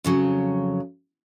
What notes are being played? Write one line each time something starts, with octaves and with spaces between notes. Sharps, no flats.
F2 C#3 F#3